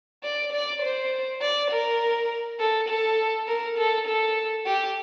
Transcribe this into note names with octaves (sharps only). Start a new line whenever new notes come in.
D5
D5
C5
D5
A#4
A4
A4
A#4
A4
A4
G4